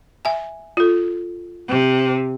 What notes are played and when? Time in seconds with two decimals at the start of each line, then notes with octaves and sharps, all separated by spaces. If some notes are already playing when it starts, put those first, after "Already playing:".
0.25 E5 G#5
0.77 F4 A4
1.68 C3